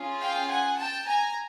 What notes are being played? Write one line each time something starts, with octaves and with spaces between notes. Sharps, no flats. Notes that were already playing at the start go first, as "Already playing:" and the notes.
Already playing: C#4 F4 G#4
F5 G5
F#5 G#5
G5 A5
G#5 A#5